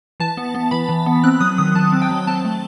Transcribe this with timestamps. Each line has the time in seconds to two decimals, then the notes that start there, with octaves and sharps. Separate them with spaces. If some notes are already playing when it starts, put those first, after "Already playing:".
0.20 E3 A5
0.37 B3
0.55 B3
0.71 E3 B5
0.89 E3
1.06 B3
1.23 C4 F#6
1.40 F#3 D#6
1.58 D#3 D#6
1.75 D#3 A5
1.92 C4
2.02 G5
2.10 F#3
2.27 C4 A5
2.44 A3